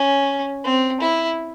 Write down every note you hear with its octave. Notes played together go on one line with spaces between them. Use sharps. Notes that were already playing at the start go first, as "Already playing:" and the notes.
Already playing: C#4
C4
E4